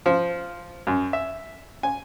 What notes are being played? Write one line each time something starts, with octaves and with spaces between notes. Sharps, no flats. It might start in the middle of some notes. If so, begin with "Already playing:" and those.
F3
F#2
E5
G#5